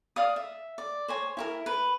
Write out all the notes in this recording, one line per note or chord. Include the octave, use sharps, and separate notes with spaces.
D5 F5 D#6
E5
D5
C5 C#5 G#5
E4 G4 A#4
B4